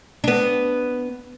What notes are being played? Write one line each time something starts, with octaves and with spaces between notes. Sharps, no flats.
B3 D4